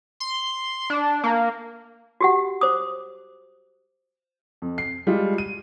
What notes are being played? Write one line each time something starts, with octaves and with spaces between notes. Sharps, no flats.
C6
D4
A#3
F#4 G4 F#5
C5 D6 D#6
F2
C7
G3 G#3 F4
D#7